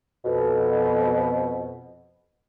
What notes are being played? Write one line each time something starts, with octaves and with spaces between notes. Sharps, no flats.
F2 B2